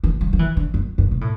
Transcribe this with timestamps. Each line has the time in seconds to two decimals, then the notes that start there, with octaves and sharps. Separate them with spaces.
0.04 E3
0.21 F#3
0.33 F#3
0.39 E3
0.57 D3
0.74 F#2
0.98 F#2
1.11 B2
1.21 A2